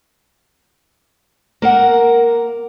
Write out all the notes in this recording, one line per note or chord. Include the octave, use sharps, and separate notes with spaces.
A#3 A#4 F#5